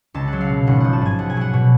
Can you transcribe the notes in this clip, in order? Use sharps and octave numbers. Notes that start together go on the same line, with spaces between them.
C#2 A5
F#5
F#3
F5
B2
G#1 F#5
F3 F#5
A5
G#2 G#5
B1 F#5
G#5
F#3 F#5
B2